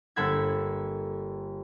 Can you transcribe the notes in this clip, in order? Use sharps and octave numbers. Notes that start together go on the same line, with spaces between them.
G1 A#3 A4 F#5 B5 G#6